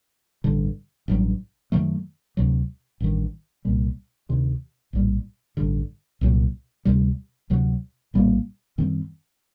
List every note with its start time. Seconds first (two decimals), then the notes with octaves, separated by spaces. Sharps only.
0.44 A1 G2 D3
1.08 A1 G2 F#3
1.72 F#2 D#3 F#3 A3
2.37 D2 C3 F#3
3.00 A1 G2 D#3
3.65 C2 A#2 G3
4.29 D2 C3 D#3
4.93 A#1 A2 G3
5.57 A1 G2 D3
6.21 C2 A#2 F#3
6.85 D2 C3 G3
7.50 D2 C3 F#3
8.14 A#1 A2 G3 A#3
8.78 F#2 D#3 G3 C4